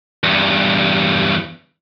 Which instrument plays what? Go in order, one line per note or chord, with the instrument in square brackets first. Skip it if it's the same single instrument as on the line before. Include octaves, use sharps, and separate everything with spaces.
[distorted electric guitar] E2 G2